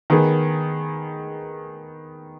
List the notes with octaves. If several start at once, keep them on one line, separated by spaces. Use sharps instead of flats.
D#3 B3 G#4